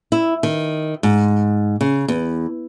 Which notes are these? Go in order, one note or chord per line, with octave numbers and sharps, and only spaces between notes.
E4
D#3
G#2
C#3
E2